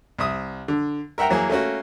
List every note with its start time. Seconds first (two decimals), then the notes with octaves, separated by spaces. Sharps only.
0.19 C2 E5 D#6
0.68 D3
1.18 A#4 E5 F#5 G5 A#5
1.29 E3 F#3 A#3 G#4
1.50 A3 A#3 C#4 F#4